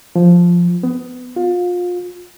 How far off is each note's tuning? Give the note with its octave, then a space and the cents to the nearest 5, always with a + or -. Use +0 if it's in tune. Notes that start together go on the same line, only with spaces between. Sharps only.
F3 +0
B3 +20
F4 +30